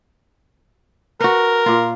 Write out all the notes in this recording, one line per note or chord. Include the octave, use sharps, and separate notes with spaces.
F#4 A#4 B4
A#2 F4